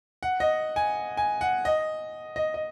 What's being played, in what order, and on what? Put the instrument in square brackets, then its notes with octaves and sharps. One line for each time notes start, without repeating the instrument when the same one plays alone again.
[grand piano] F#5
D#5
G#5
G#5
F#5
D#5
D#5
D#5